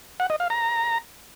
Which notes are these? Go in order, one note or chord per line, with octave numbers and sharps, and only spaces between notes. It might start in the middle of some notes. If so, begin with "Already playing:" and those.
F#5
D#5
F5
A#5